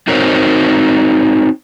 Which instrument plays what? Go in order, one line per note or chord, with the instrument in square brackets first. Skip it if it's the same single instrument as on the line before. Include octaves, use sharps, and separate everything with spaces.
[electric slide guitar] C4 D#4 F#4 A#4 C5 C#5